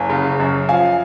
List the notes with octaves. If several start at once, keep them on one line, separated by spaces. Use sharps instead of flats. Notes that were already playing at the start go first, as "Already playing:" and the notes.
Already playing: F#1 G#5
C#3
F#2
F3 F5 G#5